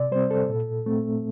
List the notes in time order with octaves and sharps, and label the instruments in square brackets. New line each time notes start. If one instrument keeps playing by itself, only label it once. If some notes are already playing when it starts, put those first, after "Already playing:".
Already playing: [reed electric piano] C3 D5
G3 C5
C4
A4
A#2
A3 C4